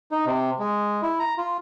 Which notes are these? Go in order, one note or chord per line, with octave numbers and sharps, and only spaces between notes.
D#4
C3
G#3
E4
A#5
F4